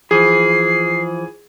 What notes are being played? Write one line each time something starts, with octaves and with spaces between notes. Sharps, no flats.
E3 F3 G#4 C7